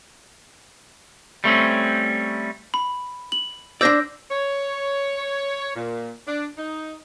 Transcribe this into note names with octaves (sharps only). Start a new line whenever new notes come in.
G3 A3 C4 C#4
B5
F#7
D4 C5 D5 E6 G6 A#6
C#5
A#2
D4
D#4